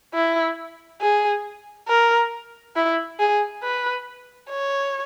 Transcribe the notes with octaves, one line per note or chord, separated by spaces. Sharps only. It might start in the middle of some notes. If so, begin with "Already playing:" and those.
E4
G#4
A#4
E4
G#4
B4
C#5